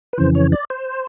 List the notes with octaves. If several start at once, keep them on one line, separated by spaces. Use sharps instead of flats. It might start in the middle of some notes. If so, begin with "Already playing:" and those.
B4
F2 C#3 E3 C5
C#5
D5
C5